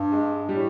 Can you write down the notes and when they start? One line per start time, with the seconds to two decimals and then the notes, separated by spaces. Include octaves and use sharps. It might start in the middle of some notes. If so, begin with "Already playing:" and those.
Already playing: G2
0.12 G#3
0.49 A2 G3